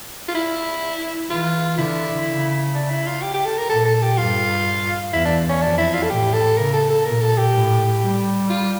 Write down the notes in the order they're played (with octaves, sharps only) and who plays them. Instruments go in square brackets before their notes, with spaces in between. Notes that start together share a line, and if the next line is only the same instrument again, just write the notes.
[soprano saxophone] F4
E4
[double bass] E3 [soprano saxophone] F4
[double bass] D3 [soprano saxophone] E4
[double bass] C#3
[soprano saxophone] D4
E4
F4
G4
G4
A4
A#4
[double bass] A#2 [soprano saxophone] A4
[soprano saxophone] A4
G4
[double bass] G2 [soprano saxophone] F4
[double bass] E2 [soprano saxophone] E4
[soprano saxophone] D4
C#4
[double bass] F2 [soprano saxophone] D4
[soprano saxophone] E4
F4
A4
[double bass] A2 [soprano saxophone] G4
[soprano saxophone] A4
[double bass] C#3 [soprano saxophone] A#4
[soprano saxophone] A4
A4
[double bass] A#2 [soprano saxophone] A#4
[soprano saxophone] A4
G4
[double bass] A2
G3
[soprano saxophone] F4